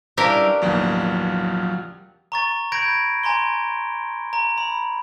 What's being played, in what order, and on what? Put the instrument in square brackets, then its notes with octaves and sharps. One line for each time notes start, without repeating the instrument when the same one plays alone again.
[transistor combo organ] G3 E4 [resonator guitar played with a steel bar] C#4 D4 B4 [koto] G4 A#4 F5
[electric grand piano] A1 D#2 B2 [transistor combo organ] F3 F#3
[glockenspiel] A#5 C#6 A6
B5 G6 G#6 A#6 D7
G#5 A#5 C6 G7
A#5
B5